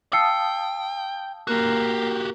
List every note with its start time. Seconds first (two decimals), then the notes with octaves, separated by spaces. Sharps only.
0.13 F5 G5 A5 D#6 E6 C7 C#7
1.47 A#3 F#4 G4